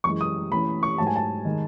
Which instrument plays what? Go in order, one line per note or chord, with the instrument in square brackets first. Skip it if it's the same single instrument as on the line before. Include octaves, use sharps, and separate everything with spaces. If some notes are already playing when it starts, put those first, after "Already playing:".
[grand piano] F#2 E3 G#3 [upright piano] C#6
[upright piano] D#6
[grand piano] E3 A3 C#4 [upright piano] B5
[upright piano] C#6
[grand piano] G#2 F#3 A3 [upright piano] A5
[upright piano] G#5
A5
[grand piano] D#3 G#3